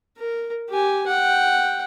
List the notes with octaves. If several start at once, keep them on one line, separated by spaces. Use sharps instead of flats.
A#4
G4 G#5
F#5 G5